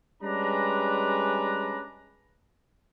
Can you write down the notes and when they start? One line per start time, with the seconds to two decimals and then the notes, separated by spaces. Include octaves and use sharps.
0.23 G3 G#3 C#4 D4 B4 A#5